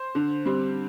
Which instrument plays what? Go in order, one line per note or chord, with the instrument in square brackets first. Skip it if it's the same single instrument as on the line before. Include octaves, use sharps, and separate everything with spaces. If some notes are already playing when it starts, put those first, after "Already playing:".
Already playing: [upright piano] C5
D3
G3 C4